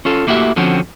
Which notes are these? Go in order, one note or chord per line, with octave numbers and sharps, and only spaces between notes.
C#4 F4 A4
A3 A#3 E4 F#4 G4 E5
D3 F3 C4 C#4 F#4